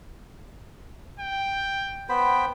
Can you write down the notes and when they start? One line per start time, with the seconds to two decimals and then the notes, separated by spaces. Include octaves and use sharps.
1.20 G5
2.09 B3 C5 G5 B5